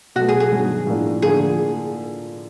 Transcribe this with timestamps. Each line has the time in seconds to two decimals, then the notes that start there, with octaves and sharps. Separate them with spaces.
0.16 B2 F#3 A3 F#4
0.29 G#4
0.40 G#4
0.52 G2 D#3 F#3 B3
0.87 A2 F3 A#3 D4
1.22 D3 F3 A#3 G#4